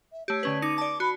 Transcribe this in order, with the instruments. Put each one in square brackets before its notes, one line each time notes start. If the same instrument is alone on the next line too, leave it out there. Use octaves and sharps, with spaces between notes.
[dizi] E5
[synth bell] A3 G4 [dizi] C#5
[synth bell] D3 C#4 B4
[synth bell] D#4 C#7 D#7 [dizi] D6
[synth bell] D5 A5
[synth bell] F#4 [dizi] B5